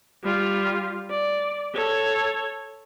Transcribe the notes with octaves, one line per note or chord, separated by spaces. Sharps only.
G3 F4
D5
A4 C#5